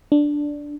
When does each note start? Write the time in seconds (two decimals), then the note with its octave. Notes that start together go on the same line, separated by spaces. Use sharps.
0.12 D4